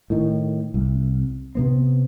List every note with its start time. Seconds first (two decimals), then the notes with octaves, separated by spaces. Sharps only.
0.10 A2 D#3
0.74 C2
1.55 C3 B3 C4